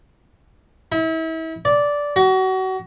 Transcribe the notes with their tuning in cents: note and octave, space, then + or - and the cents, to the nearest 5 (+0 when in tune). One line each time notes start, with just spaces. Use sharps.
E4 -35
D5 -10
F#4 +30